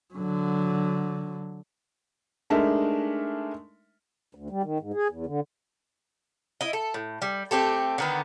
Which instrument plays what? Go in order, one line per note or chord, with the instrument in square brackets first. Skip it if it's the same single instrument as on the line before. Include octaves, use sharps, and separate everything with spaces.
[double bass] D3 F#3
[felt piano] G#3 A3 D4 D#4 A#4 E5
[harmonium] D2
G3
D#3
G#2
G#4
E2
D3
[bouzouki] E4 D#5
A4
A2
G3
A3 C4 G4 A4
D3 D#3 B3